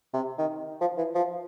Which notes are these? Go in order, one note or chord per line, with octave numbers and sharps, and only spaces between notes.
C3
D#3
F3
E3
F3